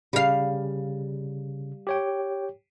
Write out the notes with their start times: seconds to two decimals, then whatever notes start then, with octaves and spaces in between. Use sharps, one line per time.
0.13 C#3 G3 F5
1.87 G4 C#5 G5